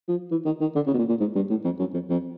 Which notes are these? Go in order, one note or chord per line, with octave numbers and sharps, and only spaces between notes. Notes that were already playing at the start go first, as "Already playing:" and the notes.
F3
E3
D#3
D#3
D3
C#3
B2
A#2
A#2
G#2
G2
A2
F2
F#2
F2
F2